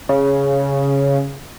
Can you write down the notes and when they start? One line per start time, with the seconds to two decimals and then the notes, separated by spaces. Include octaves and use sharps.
0.09 C#3